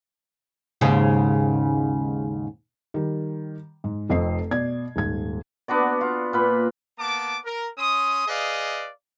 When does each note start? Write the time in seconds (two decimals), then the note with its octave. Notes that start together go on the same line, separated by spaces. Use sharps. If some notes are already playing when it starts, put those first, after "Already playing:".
0.81 D#2 G#2 C#3
2.94 D#3 G3
3.84 G#2
4.09 F1 F2 C4 D#5 C7
4.51 B2 D5 G#6
4.96 D#1 G#2 G#6
5.68 B3 D4 F#4 D5
6.01 F4
6.33 A#2 B4 B5
6.99 A#3 B3 A5 D6
7.45 A#4
7.78 C#4 C6 D#6
8.28 G#4 B4 D5 D#5 F5